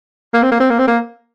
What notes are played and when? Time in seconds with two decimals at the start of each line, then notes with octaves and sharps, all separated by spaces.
0.34 A#3
0.42 C4
0.51 A#3
0.60 C4
0.70 A#3
0.79 C4
0.88 A#3